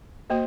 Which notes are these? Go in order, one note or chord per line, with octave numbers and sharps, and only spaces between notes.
A#3 F#4 C5 D#5